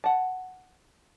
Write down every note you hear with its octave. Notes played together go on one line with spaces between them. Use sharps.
F#5 A5